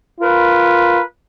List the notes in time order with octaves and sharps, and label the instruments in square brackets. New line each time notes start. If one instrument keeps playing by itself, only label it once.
[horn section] F4 A#4 B4